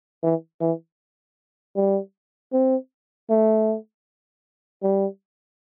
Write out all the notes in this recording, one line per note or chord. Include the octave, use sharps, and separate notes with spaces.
E3
E3
G3
C4
A3
G3